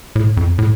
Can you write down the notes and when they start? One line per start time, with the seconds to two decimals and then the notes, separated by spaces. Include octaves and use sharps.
0.16 A2
0.37 F2
0.59 A2